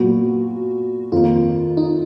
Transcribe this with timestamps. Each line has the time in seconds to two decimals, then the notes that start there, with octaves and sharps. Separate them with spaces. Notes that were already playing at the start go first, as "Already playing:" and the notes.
Already playing: A#2 F#3 B3 F#4
1.12 F2 D#3 A#3 F4
1.77 D#4